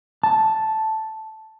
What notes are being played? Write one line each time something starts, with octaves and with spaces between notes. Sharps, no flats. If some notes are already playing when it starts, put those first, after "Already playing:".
A5